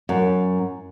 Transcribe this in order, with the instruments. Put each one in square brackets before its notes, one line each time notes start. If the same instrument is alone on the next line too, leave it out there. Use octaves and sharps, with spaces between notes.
[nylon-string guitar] F#2